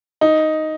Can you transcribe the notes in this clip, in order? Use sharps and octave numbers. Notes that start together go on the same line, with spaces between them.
D#4